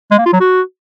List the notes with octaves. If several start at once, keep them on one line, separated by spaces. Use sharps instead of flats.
G#3
A#3
F4
F#3
F#4